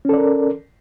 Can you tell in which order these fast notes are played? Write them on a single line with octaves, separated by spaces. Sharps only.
C#4 A4 D5 A#4